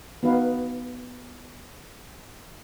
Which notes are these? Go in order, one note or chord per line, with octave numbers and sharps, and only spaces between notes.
B3 D#4 F#4 B4 F5